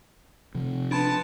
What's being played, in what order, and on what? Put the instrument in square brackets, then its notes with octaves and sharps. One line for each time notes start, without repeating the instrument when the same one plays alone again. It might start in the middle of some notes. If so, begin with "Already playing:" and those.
[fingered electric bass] C3 F3
[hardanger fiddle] B3 A5 [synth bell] D4 B5 C6